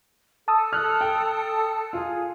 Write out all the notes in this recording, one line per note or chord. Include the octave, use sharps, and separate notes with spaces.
A4 A5 D#6 E6
F6 F#6
G5
F4 G#4